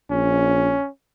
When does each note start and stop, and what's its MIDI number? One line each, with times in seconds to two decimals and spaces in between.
0.10 0.76 34
0.10 0.88 61